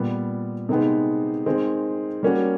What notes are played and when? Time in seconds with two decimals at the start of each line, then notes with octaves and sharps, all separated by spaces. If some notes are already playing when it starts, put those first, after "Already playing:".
Already playing: A#2 G3 B3
0.69 C3 D#3 G#3 B3 D#4
1.46 D#3 G#3 C4 D#4
2.23 G3 A#3 C#4 F#4